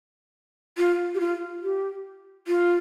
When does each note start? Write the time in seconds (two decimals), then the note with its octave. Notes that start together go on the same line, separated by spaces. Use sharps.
0.78 F4
1.15 G4
1.20 F4
1.63 G4
2.48 F4